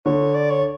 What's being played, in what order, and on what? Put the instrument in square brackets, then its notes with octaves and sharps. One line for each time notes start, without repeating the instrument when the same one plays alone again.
[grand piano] D3 [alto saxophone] C#5
[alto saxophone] D5
C#5